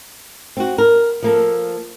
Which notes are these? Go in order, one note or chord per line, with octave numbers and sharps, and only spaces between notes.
C4 F#4
A#4
F3 A#3 A4